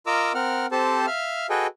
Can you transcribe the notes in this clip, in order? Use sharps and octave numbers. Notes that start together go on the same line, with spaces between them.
F4 A#4 D#5 A#5 D6 E6
C4 A#4 F#5 F6
C4 G4 A4 C5 A5
E5 F5 F6
F#4 G#4 A4 B4 D#5 G5